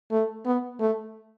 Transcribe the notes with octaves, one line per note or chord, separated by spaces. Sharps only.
A3
B3
A3